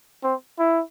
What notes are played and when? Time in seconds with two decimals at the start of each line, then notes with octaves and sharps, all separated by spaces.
0.23 C4
0.59 E4